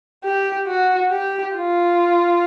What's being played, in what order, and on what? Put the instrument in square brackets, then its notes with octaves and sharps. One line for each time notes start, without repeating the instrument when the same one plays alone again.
[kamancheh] G4
F#4
G4
F4